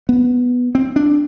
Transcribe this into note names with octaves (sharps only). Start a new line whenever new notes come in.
B3
C4
D4